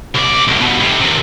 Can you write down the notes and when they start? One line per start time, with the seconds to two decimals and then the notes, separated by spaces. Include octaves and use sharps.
0.15 C2 D5
0.48 B1 A2
0.60 G2 B2
0.80 F2 C3
1.01 D#2 C3